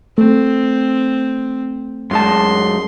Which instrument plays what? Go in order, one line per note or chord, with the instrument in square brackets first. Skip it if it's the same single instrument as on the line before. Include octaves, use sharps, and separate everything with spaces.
[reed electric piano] A3 [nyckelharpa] C4
[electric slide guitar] F#2 G#3 A5 [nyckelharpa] C6